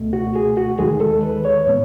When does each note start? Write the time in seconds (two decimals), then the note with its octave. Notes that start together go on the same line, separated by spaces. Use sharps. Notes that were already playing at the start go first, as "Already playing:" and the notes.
Already playing: C#2 B2 A3
0.13 F#4
0.35 G#4
0.57 F#4
0.79 D#2 D#3 G#3 G#4
1.00 A4
1.23 B4
1.45 C#5
1.66 A2 E3 B3